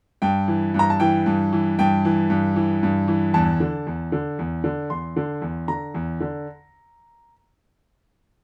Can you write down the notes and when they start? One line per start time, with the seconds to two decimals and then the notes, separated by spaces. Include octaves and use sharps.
0.22 G2 G5
0.48 E3
0.74 G2 A#5
0.90 A5
1.00 E3 G5
1.26 G2
1.52 E3
1.79 G2 G5
2.05 E3
2.30 G2
2.56 E3
2.83 G2
3.08 E3
3.34 E2 A5
3.60 D3
3.87 E2
4.12 D3
4.39 E2
4.64 D3
4.90 E2 C6
5.16 D3
5.42 E2
5.68 D3 A#5
5.94 E2
6.20 D3